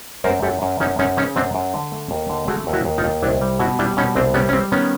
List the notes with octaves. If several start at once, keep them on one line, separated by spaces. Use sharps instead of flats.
F#2 A#4 C5
F#2 G4 A4
F#2
F#2 C#4 D#4
F#2 C#4 D#4
C#3 C#4 D#4
F#2 C4 D4
F#2
D3
A3
D#2
D3
A3 F#4 G#4
D#2
E4 F#4
D#2
D#4 F4
D#2
C2 D4 E4
G3
B2 E4 F#4
G3 D4 E4
B2 C#4 D#4
C2 C4 D4
G3 B3 C#4
C#4
G3 C4
D#3 B3 C#4